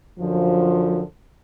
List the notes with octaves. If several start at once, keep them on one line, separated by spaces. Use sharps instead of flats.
F#2 D3 F3